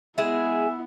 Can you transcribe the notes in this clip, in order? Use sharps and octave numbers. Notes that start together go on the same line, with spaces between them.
G#3 B3 E4 G#4 E5